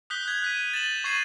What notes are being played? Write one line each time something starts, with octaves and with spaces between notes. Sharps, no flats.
D#6 F#6 G6 B6 G7
F#6 G#6
F#6 B6 D#7
A6 E7 F#7 G7
C#6 G#6 C7 D#7 E7 F#7